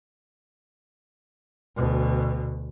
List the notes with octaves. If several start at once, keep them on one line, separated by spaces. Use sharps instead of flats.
D2 B2